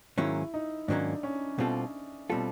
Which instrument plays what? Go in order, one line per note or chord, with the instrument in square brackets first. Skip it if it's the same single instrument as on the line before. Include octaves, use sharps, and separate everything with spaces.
[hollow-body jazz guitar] G#2 D#3 F#3 A#3 C#4 [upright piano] E4
[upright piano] D#4
[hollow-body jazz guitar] G#2 D#3 F#3 A#3 C#4 [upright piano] D4
[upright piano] C#4
[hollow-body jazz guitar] B2 G3 C4 F4 A4
B2 G3 C4 F4 A4